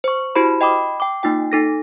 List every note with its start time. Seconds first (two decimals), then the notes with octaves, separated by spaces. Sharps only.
0.04 C5 C#6
0.35 E4 F#4 G4 C5 B5
0.61 D#5 G5 B5 D6 D#6
1.00 G5 D6
1.23 A#3 D#4 F4 G5
1.52 D#4 A4 A#6